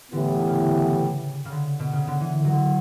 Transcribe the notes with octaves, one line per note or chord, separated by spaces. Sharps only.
A2 D3 E3 B3 E4 G4
C#3
C#3
D3
B2
C#3
D3
E3
F#3